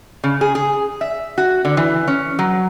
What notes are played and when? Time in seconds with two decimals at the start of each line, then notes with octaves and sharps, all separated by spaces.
0.24 C#3
0.41 G#4
0.55 G#4
1.01 E5
1.38 F#4
1.65 D3
1.77 E3
2.07 C#4
2.39 F#3